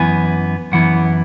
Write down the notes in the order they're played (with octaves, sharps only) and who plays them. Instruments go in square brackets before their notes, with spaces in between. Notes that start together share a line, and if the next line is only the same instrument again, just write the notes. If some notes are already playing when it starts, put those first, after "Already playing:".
Already playing: [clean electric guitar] F#2 E3 B3 E4 G#5
F#2 E3 B3 E4 F#5